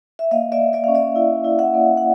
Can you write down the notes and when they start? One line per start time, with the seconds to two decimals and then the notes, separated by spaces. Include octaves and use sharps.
0.19 E5
0.31 A#3 D#5 F5
0.52 D5 E5
0.59 A#3
0.73 D5 E5
0.84 C#4 F5
0.95 D5 E5
1.16 E4
1.44 E4
1.59 E5 F#5
1.74 A#3
1.97 F#5